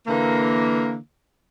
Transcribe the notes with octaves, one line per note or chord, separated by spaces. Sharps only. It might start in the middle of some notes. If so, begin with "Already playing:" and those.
D3 E3 A#3